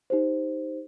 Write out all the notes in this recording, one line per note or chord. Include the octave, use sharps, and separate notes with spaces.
D#4 G4 C5